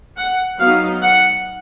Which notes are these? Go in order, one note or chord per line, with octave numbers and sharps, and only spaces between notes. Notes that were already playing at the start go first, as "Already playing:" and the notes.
F#5
F#3 B3 D#4 F5
F#5